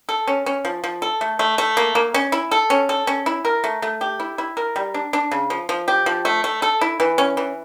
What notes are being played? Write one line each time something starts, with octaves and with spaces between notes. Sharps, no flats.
A4
C#4
C#4
F3
F3
A4
A3
A3
A3
A#3
A#3
C#4
E4
A4
C#4
A4
C#4
E4
A#4
A3
A3
G4
E4
E4
A#4
G3
D4
D4
C#3
F3
F3
G4
F3
A3
A3
A4
E4
E3
C#4
E3